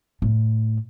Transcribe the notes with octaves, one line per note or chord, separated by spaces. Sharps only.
A2